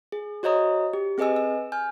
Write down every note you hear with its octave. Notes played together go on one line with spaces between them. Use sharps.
G#4
F#4 C5 C#5 D#5 A#5 D#6
G4
C4 G#4 B4 D#5 G#5 E6
E6
G#5 F6 G6